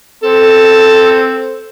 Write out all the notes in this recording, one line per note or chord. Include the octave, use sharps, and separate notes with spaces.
C4 A4